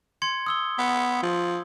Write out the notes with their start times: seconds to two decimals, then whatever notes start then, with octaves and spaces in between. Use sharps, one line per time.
0.22 C6 G#6 C#7
0.46 D#6 E6 G7
0.78 B3
1.23 F3